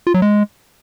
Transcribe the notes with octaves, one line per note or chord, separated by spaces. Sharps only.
F4
F#3
G#3